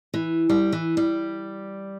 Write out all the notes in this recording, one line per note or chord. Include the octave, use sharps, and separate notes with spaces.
E3
G3
E3
G3